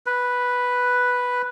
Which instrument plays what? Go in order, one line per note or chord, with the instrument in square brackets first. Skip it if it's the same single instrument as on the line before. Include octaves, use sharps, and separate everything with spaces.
[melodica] B4